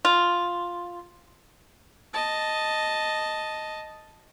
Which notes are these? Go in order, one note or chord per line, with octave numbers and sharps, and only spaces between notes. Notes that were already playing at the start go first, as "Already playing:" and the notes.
F4
D#5 A5